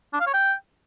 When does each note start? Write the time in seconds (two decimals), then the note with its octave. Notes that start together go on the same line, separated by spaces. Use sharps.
0.13 D4
0.20 F5
0.27 C#5
0.34 G5